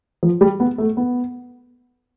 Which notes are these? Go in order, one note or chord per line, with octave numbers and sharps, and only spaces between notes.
F3
G3
B3
A3
B3